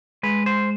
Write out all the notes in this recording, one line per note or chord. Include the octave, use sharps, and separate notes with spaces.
G#3 B4
C5